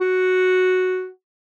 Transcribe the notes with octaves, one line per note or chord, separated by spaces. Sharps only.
F#4